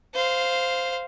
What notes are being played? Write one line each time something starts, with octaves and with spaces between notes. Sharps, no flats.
C5 F5